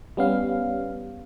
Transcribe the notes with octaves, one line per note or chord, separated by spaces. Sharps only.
G3 B3 C#4 F5